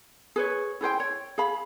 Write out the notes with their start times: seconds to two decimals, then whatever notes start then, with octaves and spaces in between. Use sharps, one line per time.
0.36 G#4 B4 C#5
0.81 E4 G#4 C5 G5
1.00 C#5
1.38 G#4 F5 B5